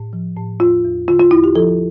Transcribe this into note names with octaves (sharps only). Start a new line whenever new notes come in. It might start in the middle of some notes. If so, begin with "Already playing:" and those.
Already playing: A2
F3
A2
E2 F4
E2
D3 F4
F4
E2 E4
G4
F3 A4